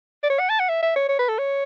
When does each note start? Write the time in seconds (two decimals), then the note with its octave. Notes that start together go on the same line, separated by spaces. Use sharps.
0.23 D5
0.30 C#5
0.39 F#5
0.49 A5
0.59 F#5
0.69 E5
0.82 E5
0.96 C#5
1.08 C#5
1.19 B4
1.29 A4
1.38 C#5